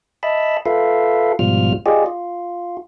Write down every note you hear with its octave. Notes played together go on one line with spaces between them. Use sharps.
D#5 E5 A5 B5
F4 A4 B4 E5 F5
G#2 B2 F3 G3 F4 F6
F4 G4 G#4 D5 D#5
F4